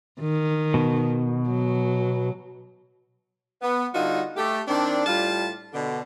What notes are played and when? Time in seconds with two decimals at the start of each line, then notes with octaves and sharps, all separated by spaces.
0.21 D#3
0.74 B2
1.49 F#3
3.62 B3
3.95 D3 G3 D#4 F4 F#4
4.37 A3 G4
4.68 D#3 C4 D4
5.07 A2 G3 F4 F5 A5
5.74 B2 D3